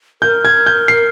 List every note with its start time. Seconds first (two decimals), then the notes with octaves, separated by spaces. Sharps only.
0.22 A#4 G6
0.45 G#6
0.66 G6
0.88 C7